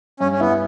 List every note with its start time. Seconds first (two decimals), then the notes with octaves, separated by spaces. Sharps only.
0.20 G2 C#4
0.32 C#4
0.39 B3 E4